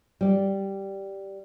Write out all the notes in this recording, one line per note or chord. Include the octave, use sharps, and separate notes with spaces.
G3 D5